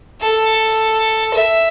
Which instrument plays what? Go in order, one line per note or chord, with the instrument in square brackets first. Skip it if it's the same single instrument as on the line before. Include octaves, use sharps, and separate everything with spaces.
[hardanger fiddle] A4
E5